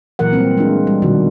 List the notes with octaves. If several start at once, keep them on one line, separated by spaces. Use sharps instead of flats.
A#2 E3 F#3 A#4 F#5
G3 C4
G#3 D4 F4
G3
B2 D#3 F#3 F#4